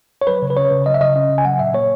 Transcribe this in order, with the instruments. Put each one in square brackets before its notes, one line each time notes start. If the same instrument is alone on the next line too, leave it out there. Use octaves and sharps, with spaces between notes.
[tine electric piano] C#5
F#3 B4
C#3
B4
C#4 C#5
C#3
F#3 D#5
E5
C#3 D#5
C#4 D#5
C#3
G#5
F#3 F#5
A#2 E5
A#3 C#5